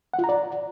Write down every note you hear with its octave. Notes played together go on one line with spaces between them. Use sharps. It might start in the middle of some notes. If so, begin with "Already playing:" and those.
F#5
F4
A#5
D5